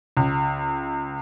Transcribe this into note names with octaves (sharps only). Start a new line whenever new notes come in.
C#2